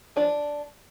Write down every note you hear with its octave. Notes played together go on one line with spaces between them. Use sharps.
F3 D4 D5